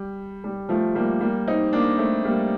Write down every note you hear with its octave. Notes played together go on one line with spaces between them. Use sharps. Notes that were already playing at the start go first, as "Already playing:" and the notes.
Already playing: G3
G3
F3 A3
G3 A#3
G3 A#3
C4 D#4
A#3 D4
A3 C4
G3 A#3